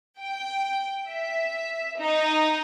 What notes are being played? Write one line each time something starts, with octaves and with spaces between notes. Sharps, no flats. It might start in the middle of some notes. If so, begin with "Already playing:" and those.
G5
E5
D#4